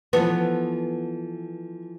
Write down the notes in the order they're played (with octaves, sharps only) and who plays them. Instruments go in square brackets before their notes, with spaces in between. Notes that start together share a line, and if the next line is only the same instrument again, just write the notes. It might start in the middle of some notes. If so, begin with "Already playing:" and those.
[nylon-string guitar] E3 F3 A4 [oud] B3